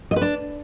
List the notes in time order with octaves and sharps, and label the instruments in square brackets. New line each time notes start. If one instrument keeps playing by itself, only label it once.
[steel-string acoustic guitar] D#5
B4
D4